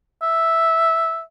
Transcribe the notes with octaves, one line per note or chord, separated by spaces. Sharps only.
E5